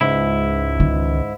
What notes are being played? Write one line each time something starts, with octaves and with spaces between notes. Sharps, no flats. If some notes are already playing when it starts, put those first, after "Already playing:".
C#2 G#2 E4
D#3